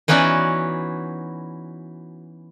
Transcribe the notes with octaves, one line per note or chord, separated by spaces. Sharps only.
E3 B3 C#4 D#4 F#4 D5